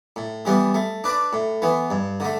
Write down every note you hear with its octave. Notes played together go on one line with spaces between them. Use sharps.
A2
E3 G3 B3
A3
D4 B4 D5
A2
E3 B3
G2
D3 A3